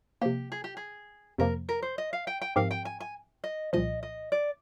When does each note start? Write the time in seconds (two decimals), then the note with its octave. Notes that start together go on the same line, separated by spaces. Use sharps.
0.21 C3 F3 A#3 G4
0.52 G#4
0.64 G4
0.77 G#4
1.38 F2 C3 F3 A#3 A#4
1.69 A#4
1.82 C5
1.98 D#5
2.13 F5
2.27 G5
2.42 G5
2.56 G#2 F3 C4 G4 A#4 F5
2.71 G5
2.85 G#5
3.00 G#5
3.44 D#5
3.73 C2 A#2 F3 D#5
4.03 D#5
4.32 D5